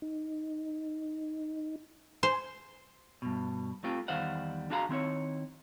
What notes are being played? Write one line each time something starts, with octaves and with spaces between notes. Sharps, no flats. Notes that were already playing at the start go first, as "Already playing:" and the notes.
D#4
C5 G#5
G2 B2
A3 C4 F4 G4
E2 D#3 G3 C5 F5 F#5
D4 F#4 G#4 F5 A5 A#5
D#3 C4 E4 C#5